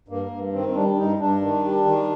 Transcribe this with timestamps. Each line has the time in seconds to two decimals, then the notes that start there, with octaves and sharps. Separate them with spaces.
0.08 G2 A#3
0.31 G2
0.52 D#3 C4
0.69 C4
0.75 G3 D4
0.89 D4
0.97 G2 D#4
1.19 G2 D4
1.41 D#3
1.64 G3
1.85 D#3